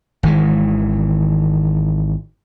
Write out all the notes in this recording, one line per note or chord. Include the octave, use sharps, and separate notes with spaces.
G#1 D#3 E3 G#3